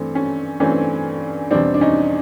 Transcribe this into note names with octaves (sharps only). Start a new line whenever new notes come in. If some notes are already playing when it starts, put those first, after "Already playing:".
Already playing: G2 E3 A3 C4
C#4
G2 E3 A3 C4 C#4
E2 B2 G3 C4 D4
D4
C#4 D#4